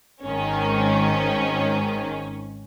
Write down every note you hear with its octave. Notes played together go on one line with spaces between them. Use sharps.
G#1 G#2 D#3 C#4